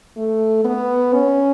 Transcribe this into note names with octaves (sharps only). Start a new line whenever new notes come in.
A3
B3
C#4